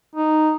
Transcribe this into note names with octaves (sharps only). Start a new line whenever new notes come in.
D#4